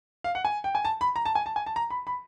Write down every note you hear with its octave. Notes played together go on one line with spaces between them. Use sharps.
F5
F#5
G#5
G5
G#5
A5
B5
A#5
A5
G#5
A5
G#5
A5
A#5
B5
B5